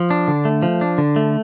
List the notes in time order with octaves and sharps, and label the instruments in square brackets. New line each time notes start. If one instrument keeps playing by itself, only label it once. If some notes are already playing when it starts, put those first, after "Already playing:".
Already playing: [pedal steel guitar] F3
D4
D3
A3
F3
D4
D3
A3